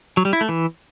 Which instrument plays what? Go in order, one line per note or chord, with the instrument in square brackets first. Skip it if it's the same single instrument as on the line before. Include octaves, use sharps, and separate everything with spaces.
[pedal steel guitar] F#3
G3
E4
A3
E3